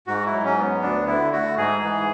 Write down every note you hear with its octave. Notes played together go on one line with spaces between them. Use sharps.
G#2 F#4
E4
F#3
C#4
B3
D2 D4
D3 E4
A3 F#4
G#2 G#4
E3